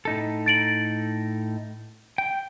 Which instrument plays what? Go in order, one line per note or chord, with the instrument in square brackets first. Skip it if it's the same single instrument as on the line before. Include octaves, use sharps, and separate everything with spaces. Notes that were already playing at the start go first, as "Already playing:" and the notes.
[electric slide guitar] A2 D#4 A4
[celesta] A6 D7 F#7
[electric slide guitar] G5